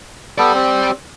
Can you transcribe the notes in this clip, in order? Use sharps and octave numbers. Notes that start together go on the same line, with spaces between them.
B3 G4 A4 D5
C4